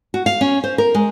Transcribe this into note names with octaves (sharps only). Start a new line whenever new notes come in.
F#4
F5
C#4
C5
A#4
G#3